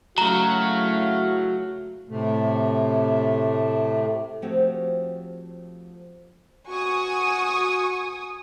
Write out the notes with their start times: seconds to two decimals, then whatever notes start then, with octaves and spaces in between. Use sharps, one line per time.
0.18 C#3 F#3 A3 E4 F#4 F5 A#5
2.09 A2 C3 A3
4.42 F3 A3 C4 F#4 G4 C#5
6.69 F#4 G#5 C#6 D#6